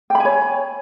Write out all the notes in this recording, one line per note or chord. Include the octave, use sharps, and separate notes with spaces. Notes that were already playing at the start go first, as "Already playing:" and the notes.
C#5 G5 G#5 B5